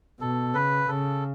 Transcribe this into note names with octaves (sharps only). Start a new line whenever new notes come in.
B2 A4
C#3 B4
C#3 A4